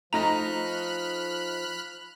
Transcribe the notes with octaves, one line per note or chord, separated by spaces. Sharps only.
F3 A3 D#4 A#5 B5 F6 F#6 A#6